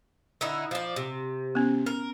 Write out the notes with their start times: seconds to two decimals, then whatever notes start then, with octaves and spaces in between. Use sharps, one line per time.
0.41 D3 D#4 E4
0.71 F3 D5
0.96 C3
1.55 B3 C#4
1.86 A#4